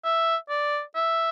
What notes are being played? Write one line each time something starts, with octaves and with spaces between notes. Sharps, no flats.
E5
D5
E5